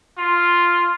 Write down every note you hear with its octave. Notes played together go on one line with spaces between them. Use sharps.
F4